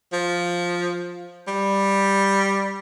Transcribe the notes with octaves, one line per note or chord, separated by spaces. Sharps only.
F3
G3